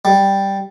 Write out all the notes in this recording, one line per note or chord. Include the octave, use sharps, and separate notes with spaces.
G3